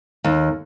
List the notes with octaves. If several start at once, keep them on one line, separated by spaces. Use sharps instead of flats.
D#2